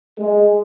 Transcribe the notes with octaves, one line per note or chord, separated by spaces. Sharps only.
G#3